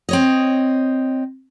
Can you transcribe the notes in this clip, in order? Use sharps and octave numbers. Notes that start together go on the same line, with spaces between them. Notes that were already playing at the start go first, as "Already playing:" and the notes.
C4 C#5 D#5